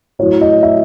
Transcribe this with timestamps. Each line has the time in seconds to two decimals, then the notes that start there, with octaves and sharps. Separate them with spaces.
0.19 A2 F#3 C#5
0.41 D#5
0.63 E5